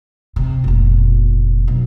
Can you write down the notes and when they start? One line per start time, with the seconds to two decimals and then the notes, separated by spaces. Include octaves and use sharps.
0.36 C3
0.64 F1 A#2
1.68 B1